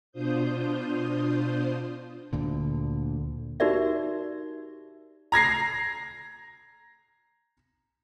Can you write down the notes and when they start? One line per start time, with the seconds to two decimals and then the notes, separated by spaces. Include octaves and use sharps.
0.12 B2 D4 F4 C5 D#6 G6
2.33 D2 A#2 D3
3.60 D#4 F#4 G4 A#4 D5 E5
5.32 A#5 G#6 A#6 C7